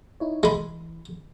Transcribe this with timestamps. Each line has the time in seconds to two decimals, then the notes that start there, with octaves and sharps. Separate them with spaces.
0.20 D#4 E4 C#5
0.43 E3 G#3 B5